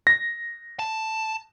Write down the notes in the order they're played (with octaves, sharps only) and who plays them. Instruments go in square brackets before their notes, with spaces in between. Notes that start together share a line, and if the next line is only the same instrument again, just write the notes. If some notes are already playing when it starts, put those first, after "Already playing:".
[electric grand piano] A#6
[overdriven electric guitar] A5